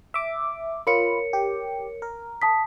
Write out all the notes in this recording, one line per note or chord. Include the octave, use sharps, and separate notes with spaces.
E5 D6
F4 A#4 C#5 B5 C#7
G4
A#4
A5 D#6 B6